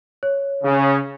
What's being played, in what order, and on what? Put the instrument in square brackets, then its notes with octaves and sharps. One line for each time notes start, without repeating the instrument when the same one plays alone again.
[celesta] C#5
[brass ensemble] C#3